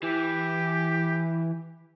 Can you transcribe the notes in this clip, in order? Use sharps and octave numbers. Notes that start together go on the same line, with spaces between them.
E3 G4